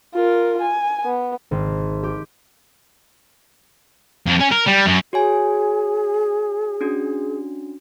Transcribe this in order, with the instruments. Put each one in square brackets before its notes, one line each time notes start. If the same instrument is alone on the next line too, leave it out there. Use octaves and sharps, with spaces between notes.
[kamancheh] F4 A#4
G#5
B3
[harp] G#1
G4
[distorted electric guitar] F2
C#4
A#4
G3
F#2
[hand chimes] F#4 C#5 G#5 [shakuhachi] G#4
[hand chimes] C#4 D4 F#4